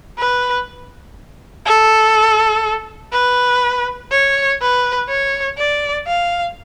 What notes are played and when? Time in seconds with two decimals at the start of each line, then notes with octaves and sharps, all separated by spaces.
0.18 B4
1.66 A4
3.13 B4
4.12 C#5
4.61 B4
5.09 C#5
5.58 D5
6.07 F5